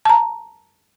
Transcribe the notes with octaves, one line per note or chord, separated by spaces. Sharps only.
A5 A#5